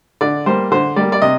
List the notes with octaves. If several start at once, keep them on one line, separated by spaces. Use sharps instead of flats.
D3 D5
G3 A#3 C5
D3 C5
G3 A#3 D5
D5
C3 D#5